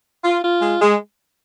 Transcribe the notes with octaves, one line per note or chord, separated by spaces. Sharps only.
F4
F4
G#3
G#3